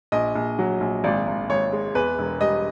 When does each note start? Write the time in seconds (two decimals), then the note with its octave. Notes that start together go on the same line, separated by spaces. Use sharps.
0.12 A#1 D#5
0.35 A#1
0.59 F#3
0.81 A#1
1.04 G#1 D5
1.27 G#1
1.49 G#1 C#5
1.73 G#3
1.95 E2 B4
2.18 E1
2.41 G3 D#5